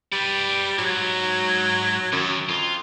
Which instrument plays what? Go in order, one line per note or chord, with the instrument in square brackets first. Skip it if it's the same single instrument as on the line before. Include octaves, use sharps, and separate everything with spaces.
[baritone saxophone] G3 [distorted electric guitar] B4 D5
[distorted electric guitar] G#2 [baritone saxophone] F#3
[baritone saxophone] F#2 [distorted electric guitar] D#3 F#3
[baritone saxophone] F2 [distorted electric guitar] F4